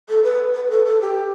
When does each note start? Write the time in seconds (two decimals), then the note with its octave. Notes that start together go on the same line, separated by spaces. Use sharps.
0.09 A4
0.24 B4
0.55 B4
0.70 A4
0.86 A4
1.01 G4